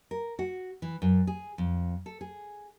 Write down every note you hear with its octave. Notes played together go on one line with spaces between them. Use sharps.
A#4
F#4
E3
F#2
G#4
F2
A4
G#4